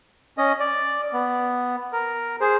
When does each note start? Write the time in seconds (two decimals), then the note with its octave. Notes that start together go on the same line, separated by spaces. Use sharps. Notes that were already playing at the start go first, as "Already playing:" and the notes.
0.38 C#4 D#5
0.60 D5
1.13 B3
1.93 A#4
2.41 G#4 C5